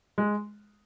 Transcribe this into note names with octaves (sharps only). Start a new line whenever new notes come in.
G#3